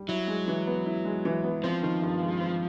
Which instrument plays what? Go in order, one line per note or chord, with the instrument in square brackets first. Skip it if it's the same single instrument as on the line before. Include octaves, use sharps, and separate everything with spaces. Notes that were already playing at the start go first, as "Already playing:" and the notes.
Already playing: [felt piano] G3
[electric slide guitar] F#3 [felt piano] E4
[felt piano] G#3
E3
B3
E4
G#3
E3
B3
[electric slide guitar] F3 [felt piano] C4
[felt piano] D#3
G2
G#3
C4